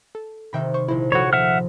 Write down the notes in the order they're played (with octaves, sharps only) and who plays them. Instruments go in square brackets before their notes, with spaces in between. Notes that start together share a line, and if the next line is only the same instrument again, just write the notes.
[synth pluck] A4
[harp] C3 D#3 [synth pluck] E5 G5 B5
[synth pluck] C5 C#6
[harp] A#1 [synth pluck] E4 C5
[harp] F3 [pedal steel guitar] F#4 C#5 [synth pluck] A4 C5 B5
[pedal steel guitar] E5 F#5 F6